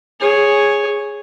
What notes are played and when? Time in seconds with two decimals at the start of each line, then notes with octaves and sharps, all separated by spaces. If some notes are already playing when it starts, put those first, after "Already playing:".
0.20 G#4 C#5